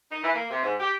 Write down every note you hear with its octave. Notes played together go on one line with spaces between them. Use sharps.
D#4
E3
A#3
C3
G#2
G4